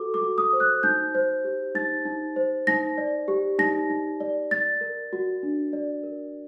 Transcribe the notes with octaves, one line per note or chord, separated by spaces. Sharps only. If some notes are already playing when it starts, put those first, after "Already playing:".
Already playing: F#4 A4 D6
D6
F#4
D#6
C5
F#6
D#4 G6
C5
G4
D#4 A6
D#4
C5
D#4 A#6
D5
G4
D#4 A#6
D#4
D5
D5 A6
A#4
F#4
D4
D5
A#4